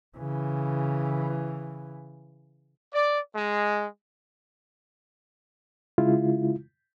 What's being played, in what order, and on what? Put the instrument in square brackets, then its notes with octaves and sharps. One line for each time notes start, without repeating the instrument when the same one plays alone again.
[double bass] C#3 E3
[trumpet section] D5
G#3
[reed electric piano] C#3 G#3 E4 F4